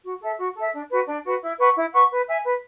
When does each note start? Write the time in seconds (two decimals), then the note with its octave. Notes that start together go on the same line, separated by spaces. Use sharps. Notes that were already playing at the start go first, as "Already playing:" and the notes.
0.04 F#4
0.20 A4 E5
0.38 F#4
0.55 A4 E5
0.72 D4
0.89 F#4 B4
1.07 D4
1.23 F#4 B4
1.41 E4
1.58 B4 F#5 C#6
1.75 E4
1.92 B4 F#5 C#6
2.10 B4
2.27 E5 G#5
2.44 B4